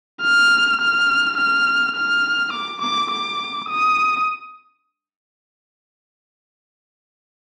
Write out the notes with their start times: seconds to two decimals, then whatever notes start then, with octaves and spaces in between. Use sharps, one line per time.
0.23 F6
0.81 F6
1.38 F6
1.96 F6
2.53 D6
2.82 D6
3.11 D6
3.69 D#6